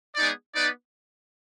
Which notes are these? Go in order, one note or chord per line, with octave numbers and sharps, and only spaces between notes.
G#3 B3 D#4 G#4 D5
B3 D#4 B4 D5